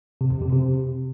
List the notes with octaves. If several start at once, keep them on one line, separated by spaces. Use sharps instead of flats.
C3
F2
C3
C3